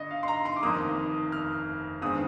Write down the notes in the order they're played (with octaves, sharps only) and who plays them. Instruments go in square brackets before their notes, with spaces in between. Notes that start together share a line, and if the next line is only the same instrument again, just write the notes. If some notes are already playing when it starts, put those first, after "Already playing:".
Already playing: [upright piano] G2 D3 D#5
F5
C6
A#5
C6
D6
F1 F2 D#3 A#3 D#6
F6
G1 G2 D#3 G#3 C4 D#6